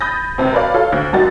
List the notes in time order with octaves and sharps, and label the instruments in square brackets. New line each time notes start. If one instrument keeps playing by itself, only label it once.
[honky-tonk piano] B5 D#6 G6 A6 A#6
C#2 C3 C4
A#4 B4 C#5 D5 F5
F4 A4 C#5 F5
D2
G#1 F#2 G3 F#4 A6